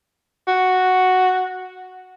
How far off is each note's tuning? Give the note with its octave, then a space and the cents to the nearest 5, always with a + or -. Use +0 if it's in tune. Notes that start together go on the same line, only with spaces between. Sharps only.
F#4 +0